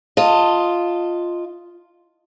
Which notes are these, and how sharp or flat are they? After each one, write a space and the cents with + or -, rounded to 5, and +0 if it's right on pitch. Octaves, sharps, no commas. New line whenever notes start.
F4 +0 D#5 +0 A5 +20